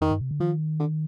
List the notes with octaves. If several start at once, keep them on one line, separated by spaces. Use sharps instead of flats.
F2 D#3
G2
C3
D3
D#3 F3
D3